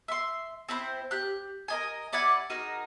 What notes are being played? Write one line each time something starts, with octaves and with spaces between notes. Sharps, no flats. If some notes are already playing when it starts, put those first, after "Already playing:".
E5 C6
C4 E4 B4 C5
G4 F#6
A#4 D#5 G#5
E4 D5 F#5 G#5
D#4 F#4 G#4 A#4